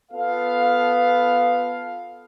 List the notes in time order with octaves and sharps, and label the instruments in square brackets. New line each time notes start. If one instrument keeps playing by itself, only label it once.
[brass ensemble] B3 F4 A4 F5